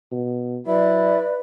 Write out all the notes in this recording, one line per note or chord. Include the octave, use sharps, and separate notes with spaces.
B2
F#3 E4 B4 D5